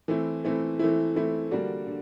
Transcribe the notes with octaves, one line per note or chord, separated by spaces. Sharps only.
E3 A3 C4 E4
E3 A3 C4 E4
E3 A3 C4 E4
E3 A3 C4 E4
D3 G3 A#3 D4 F#4
D3